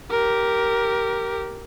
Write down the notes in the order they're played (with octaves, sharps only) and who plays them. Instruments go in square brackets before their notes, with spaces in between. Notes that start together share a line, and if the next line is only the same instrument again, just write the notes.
[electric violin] G4 A#4